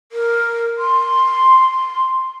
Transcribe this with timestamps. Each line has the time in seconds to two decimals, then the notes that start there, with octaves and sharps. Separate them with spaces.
0.12 A#4
0.78 C6